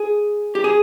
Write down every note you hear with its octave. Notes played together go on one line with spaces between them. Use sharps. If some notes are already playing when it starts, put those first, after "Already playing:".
Already playing: G#4
G4
G#4